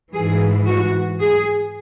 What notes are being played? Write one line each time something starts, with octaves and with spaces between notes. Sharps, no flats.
G#2 E3 G#4
F#4
G#4